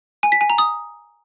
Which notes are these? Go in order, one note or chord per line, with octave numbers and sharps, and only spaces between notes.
G#5
B6
G#5
A#5
D#6